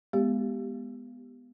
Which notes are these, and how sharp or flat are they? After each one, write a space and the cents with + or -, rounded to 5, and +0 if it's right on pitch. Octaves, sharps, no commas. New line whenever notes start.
G#3 +0 B3 +0 G4 +0